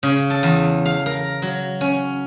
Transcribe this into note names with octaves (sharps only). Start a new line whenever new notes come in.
C#3
A4
E2
F5
A#4
F#3
C#4